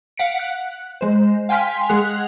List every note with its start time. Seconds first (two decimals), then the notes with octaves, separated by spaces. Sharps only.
0.17 F5 F#5 B6 C#7 D7
0.39 F#6
1.01 G#3 C5
1.49 F5 G5 G#5 C6 F6 B6
1.89 G#3 G#4 F#5 F#6 F7